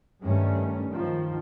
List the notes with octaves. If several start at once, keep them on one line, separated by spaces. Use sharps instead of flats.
G2 D#3 G3 A3 C#4
D#3 F3